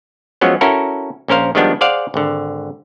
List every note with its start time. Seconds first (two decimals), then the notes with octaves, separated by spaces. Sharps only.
0.41 F3 F#3 G#3 B3 C#4
0.61 C#4 E4 F#4 A4 A#4
1.28 A#1 C#4 A#4 C5 F5
1.55 D#3 F3 G3 G#3 B3 D4
1.81 G#4 C5 D5 F5 F#5
2.14 G#1 D3